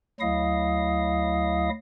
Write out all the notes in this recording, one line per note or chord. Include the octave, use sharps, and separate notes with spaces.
D2 F#3 E4 D#5 F5 D#6